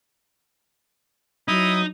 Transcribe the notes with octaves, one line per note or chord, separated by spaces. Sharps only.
F#3 D#4 E4 D#6